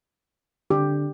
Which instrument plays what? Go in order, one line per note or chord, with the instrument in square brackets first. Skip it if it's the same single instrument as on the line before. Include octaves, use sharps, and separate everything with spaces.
[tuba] D3 [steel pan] G4